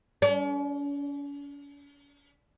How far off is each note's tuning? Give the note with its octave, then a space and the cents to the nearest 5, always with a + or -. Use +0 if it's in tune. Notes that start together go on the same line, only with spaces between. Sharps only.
C#4 +45